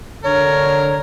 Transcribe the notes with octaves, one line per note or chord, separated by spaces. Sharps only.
D3 A#4 C#5